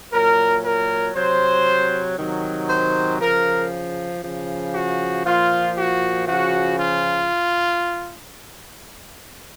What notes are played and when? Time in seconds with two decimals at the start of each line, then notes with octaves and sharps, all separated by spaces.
0.12 A#2 F#3 A#4
0.63 A#4
1.15 C3 F#3 C5
2.17 C3 D#3 F#3
2.68 C5
3.20 C#3 F3 A#4
4.22 C#3 F3
4.74 F#4
5.24 A#2 F3 F4
5.76 F#4
6.27 C#3 F3 F#4
6.78 F4